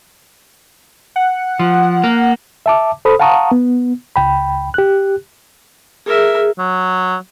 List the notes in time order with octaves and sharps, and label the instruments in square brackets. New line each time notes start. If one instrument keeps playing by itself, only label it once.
[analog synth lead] F#5
[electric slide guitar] F3
A#3
[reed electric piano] E5 A5 D6
A4 C5 B5 D#6
F5 F#5 A5 A#5 C#6 D#6
B3
C#2 G5 B5
G4 F#6
[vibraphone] G#4 [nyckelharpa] A#4 E5
[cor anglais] F#3